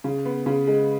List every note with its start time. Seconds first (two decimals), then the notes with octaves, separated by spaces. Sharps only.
0.04 C#3
0.25 B3
0.46 C#3
0.67 G#3